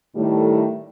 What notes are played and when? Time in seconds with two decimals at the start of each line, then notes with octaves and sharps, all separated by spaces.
0.16 A2 D#3 G3 A3